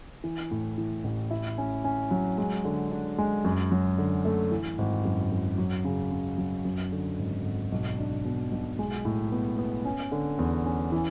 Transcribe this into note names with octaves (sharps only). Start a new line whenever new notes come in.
E3
A2
E3
A1
E4
C#4
C#4
F#3
G#3
D3
D4
G#3
F#2
F#3
D3
A3
E3
G#1
F#2
F#2
F#3
C#3
C#3
F#3
F#2
D3
G#1
G#1
B1
D4
B2
B1
G#3
A2
B3
B3
C#4
D3
E2
C#4
E3